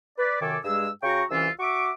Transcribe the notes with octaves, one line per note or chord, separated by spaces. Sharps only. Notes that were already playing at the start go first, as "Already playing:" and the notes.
B4 D5
F#2 C3 D#3 A4 G#5 D6
G2 G#3 G#4 E6
C#3 F#4 G5 A#5 C#6
C2 E3 C#4 F4 E6
F#4 E5 C#6 D6